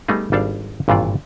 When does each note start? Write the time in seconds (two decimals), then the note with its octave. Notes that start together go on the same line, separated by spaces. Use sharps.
0.08 G3 A3 B3 D#4 G#4
0.32 G#1 G3 D4 A4 D5 F5
0.88 G#1 G2 A#2 E3 F4 D5